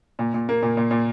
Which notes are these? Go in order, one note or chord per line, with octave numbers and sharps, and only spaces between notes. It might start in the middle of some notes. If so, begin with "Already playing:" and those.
A#2
A#2
A#3
A#2
A#2
A#2